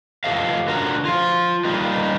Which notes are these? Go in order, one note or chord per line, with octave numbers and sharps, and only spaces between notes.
F3 G4 A4 D#5 F5
D3 F#4 A#4
F3 F4
G3 A#3 D#4